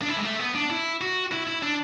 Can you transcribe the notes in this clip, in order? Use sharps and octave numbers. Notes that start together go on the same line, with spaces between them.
D4
E4
G#3
A3
B3
D4
E4
F#4
E4
E4
D4